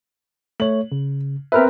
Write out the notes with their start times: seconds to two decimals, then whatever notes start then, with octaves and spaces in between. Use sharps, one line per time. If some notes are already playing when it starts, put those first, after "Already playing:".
0.60 A3 C#5 F#7
0.92 C#3
1.52 C4 A#4 B4 E5 B5 F6